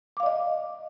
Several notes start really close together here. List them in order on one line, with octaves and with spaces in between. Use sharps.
D6 F5 D5 D#5